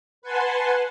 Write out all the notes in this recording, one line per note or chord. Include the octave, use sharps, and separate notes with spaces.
B4 F#5 G#5 A5 C6